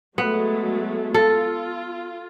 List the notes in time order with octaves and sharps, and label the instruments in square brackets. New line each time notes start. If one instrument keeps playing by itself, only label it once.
[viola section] F#3 G#3 A3 [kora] B3
[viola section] F4 [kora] A4